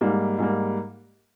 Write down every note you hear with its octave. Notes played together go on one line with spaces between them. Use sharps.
G#2 G3 A#3
G#2 G3 A#3